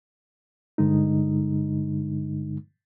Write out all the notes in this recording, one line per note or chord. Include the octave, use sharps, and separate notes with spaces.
G2 D3 G#3 D#4